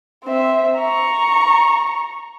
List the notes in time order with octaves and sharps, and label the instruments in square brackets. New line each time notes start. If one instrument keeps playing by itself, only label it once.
[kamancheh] C4 E5
A#5 C#6